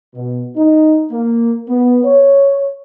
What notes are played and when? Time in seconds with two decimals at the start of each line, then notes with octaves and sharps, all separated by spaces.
0.14 B2
0.56 D#4
1.11 A#3
1.68 B3
2.03 C#5